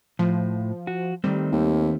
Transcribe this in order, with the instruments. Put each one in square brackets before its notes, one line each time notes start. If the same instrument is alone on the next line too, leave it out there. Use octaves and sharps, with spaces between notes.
[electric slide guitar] A2 [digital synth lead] F3
[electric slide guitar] F#4
[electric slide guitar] D#3 A3 C4 [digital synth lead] G3
[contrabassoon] D#2